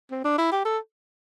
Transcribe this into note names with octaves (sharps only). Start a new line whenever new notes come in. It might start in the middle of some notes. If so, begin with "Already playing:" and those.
C4
D4
E4
G4
A4